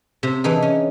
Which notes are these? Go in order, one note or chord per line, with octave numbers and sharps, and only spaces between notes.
C3
E3 D4 D#4 G#4
C#4